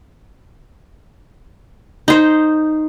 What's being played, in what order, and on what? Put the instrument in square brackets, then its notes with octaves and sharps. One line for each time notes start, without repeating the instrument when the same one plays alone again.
[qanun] D#4 C5